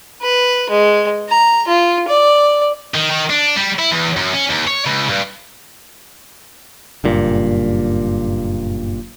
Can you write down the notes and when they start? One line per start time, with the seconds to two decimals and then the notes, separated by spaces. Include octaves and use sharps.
0.22 B4
0.70 G#3
1.29 A#5
1.67 F4
2.08 D5
2.94 D#3
3.11 D#3
3.30 D4
3.56 G3
3.79 E4
3.91 E2
4.17 F#2
4.34 C#4
4.50 D#2
4.67 C#5
4.86 C#2
5.09 G2
7.04 F#1 G2 A#2